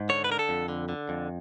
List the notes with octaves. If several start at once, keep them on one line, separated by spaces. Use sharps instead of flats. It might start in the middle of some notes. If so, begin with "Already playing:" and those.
Already playing: G#2
D3 C#5
B4
D3 A#4
A4
F2
D3
D3
F2